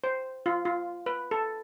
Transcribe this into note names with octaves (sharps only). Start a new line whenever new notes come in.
C5
F4
F4
B4
A4